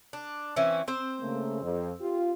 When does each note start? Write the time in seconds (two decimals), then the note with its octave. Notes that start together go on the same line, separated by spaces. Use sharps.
0.13 D4
0.56 E3 C4 C#4
0.88 C4 C5
1.20 C#3 A3 A#3
1.62 F2
2.01 F4 G4